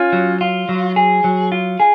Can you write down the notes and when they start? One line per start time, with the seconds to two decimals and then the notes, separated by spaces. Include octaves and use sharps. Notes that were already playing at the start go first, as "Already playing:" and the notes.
Already playing: C#4 F4
0.13 F#3
0.41 F4
0.69 F#3
0.96 G#4
1.24 F#3
1.52 F4
1.80 G#4